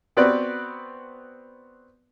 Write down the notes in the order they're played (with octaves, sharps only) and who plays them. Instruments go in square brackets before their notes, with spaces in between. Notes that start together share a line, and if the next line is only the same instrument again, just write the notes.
[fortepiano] B3 C4 F#4 B4 D5